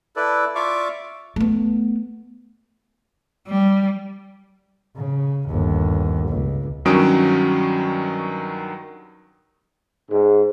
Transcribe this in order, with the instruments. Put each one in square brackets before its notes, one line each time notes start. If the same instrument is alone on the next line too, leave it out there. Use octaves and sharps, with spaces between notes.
[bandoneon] E4 A4 B4 D5
F4 D5 E5 F5 C#6 D6
[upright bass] A3 B3
[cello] G3
[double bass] C#3
G1 D#2
C#2
[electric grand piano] G2 D#3 F#3 C#4 D#6 D7
[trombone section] G#2